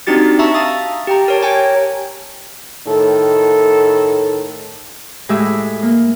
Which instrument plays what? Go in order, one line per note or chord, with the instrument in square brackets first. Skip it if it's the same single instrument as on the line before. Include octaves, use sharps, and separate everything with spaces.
[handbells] C4 D4 D#4 F#4 G4 A6
E5 A5 A#5 C#6 E6
F5 A5 A#5 D#6 A6
G4 G5 A#5
A#4 C#5 A5
G4 C#5 G5 G#5 A#5
[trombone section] A2 D#3 A4
[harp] A2 G#3 G4 G#4 E5 E6
A#3